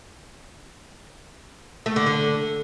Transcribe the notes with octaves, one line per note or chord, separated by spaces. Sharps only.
A3
D3
D3